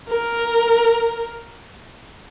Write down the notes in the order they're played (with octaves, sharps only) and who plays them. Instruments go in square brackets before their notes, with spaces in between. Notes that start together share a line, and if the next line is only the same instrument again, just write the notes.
[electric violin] A#4